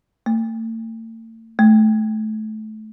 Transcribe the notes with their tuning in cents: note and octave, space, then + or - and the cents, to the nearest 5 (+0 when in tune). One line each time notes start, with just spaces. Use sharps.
A3 +45
A3 -20